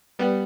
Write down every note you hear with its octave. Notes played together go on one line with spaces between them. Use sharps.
G3 B3